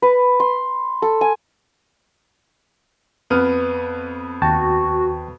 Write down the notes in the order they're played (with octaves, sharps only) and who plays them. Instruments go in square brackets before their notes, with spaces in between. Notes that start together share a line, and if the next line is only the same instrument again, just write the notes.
[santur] B4
C6
A4
G#5
[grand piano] F2 B3 F6
[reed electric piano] D#2 G5 A5 [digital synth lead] F#4